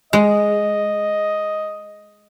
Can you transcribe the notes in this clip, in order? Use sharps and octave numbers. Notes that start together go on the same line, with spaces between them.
G#3 D#5